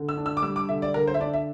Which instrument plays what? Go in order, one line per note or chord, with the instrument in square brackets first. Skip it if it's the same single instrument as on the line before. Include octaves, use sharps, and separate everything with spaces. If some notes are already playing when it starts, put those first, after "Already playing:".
Already playing: [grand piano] D3
E6
D4
E6
D6
G3 E6
D6
D3 E5
D5
D3 A#4
C5
E5
D4 D5
E5